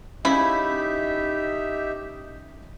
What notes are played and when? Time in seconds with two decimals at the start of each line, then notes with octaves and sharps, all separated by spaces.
0.25 C#3 C#4 D#4 E4 G4 E5 B5